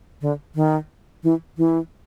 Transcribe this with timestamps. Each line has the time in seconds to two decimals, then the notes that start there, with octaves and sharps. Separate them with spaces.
0.21 D3
0.55 D#3
1.23 E3
1.58 E3